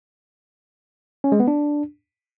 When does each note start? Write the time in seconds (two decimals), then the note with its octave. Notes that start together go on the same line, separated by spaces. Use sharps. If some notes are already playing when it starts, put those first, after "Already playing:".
1.24 C#4
1.32 G#3
1.40 B3
1.48 D4